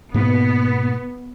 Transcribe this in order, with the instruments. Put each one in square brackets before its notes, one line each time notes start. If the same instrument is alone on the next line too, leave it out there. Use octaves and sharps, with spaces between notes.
[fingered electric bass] G#2 B2 A#3 [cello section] B3